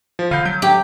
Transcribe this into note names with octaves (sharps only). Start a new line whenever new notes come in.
F3
D3 F5 B5 G6
F#3 G6
G4